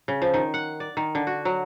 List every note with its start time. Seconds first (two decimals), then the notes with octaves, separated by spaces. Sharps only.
0.08 C#3
0.22 F3
0.34 D#3
0.54 F#5
0.80 D5
0.97 D#3
1.15 D3
1.27 F#4
1.45 F#3